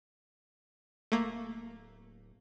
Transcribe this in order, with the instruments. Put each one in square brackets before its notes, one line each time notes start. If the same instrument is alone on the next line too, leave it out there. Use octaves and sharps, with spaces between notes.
[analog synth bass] D1 [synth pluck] A3 A#3